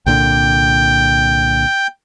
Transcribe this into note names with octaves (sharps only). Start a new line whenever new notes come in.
C2 A#2 D3 G5